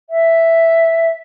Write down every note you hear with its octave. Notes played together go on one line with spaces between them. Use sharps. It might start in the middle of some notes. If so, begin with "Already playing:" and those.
E5